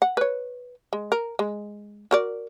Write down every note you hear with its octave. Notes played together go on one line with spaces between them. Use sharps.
F#5
B4 C#5
G#3
A#4
G#3
F#4 A#4 D5